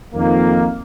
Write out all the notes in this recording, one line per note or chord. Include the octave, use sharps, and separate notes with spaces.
F2 D#3 A#3